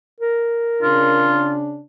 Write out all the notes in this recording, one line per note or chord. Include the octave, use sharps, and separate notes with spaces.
A#4
C#3 D4 F4